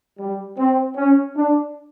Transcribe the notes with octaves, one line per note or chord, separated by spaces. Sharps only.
G3
C4
C#4
D4